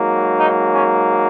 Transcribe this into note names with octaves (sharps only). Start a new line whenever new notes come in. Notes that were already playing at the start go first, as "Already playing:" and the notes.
Already playing: G#2 F#3 A#3
D#4
C#4